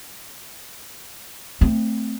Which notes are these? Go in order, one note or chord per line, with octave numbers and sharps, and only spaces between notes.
A3 C4